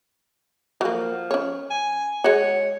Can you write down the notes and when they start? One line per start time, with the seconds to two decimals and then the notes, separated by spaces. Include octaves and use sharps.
0.81 F3 F#3 A#3
1.31 C#4 C#5
1.70 G#5
2.24 G#3 F#4 C#5